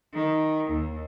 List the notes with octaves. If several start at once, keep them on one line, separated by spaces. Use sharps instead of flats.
D#3
D#2